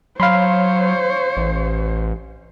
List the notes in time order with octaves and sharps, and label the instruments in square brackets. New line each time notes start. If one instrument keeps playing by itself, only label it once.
[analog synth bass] F#3 [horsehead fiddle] C5 C#5 [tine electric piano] F5 B5 C6
[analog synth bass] A1